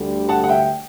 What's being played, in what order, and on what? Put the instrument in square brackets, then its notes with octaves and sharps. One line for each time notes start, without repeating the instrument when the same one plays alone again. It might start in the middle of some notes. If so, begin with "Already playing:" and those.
Already playing: [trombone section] D2 D3 G3
[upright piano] F#5 A5
F#5
E5 G5